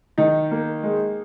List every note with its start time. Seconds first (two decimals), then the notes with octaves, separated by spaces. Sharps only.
0.18 D#3 D#4
0.51 A#3
0.83 G#3